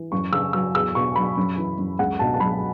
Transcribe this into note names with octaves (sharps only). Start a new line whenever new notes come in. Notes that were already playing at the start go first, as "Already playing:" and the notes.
Already playing: E3
F#2 C#6
C#3 E6
F#3 E6
E2 E6
B2 C#6
F#3 B5
F#2
E3
F#2
C#2 F#5
B2 A5
A5
F#3 B5